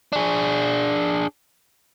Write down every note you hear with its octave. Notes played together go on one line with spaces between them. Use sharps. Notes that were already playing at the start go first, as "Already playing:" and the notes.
D4 G#4